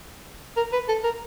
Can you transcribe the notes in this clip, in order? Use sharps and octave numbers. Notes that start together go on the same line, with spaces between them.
A#4
B4
A4
A#4